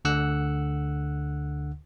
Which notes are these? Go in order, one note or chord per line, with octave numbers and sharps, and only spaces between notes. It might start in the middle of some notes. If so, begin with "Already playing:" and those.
D2 D3 F#5 E6 F#6